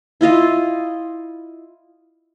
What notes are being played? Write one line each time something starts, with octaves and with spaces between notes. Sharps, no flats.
E4 F4 D#5 F5